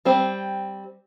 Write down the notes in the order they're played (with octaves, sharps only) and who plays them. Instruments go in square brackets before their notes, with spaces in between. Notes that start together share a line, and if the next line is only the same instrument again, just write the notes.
[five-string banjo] G3 C4